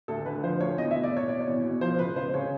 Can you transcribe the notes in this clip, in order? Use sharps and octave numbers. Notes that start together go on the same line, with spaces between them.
D2 A4
D3 B4
F3 C5
D2 C#5
E2 D#5
E5
B2
D5
E2 C#5
B2 D5
C#5
E2
B2
F3 C5
C#2 B4
C#2 C5
C#3 C#5